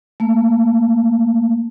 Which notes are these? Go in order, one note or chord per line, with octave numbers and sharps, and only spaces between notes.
A3 A#3